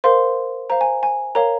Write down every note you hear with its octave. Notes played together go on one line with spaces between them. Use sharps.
A#4 C5 F5 C6
C5 F5 A#5
G#5
G#5
A#4 C#5 F5 A#5